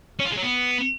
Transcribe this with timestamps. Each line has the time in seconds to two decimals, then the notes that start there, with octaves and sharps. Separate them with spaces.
0.19 C#4
0.25 F4
0.31 G#3
0.37 F#3
0.43 B3